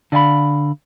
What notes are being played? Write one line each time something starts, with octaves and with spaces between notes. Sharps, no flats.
D3 D5 F5 G#5 B5